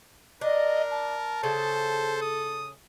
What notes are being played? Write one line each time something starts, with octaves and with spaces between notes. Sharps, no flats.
D4 A#4 D#5
A5
C#3 A4 C5
D#6